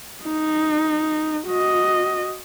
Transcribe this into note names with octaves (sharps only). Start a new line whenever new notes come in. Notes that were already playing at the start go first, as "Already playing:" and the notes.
D#4
F#4 D#5